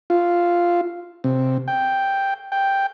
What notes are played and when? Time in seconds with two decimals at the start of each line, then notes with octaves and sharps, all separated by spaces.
0.10 F4
1.24 C3
1.68 G5
2.52 G5